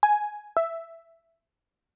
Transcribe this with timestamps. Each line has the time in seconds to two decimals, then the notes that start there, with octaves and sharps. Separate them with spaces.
0.03 G#5
0.57 E5